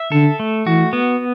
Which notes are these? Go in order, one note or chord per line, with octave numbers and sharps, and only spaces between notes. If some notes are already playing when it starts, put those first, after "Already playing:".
Already playing: E5
D3 A4
A3
E3 F#4
B3